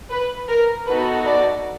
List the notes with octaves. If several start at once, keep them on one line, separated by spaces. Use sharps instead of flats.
B4
A#4
B3 D#4 F#4 A4 B4
D5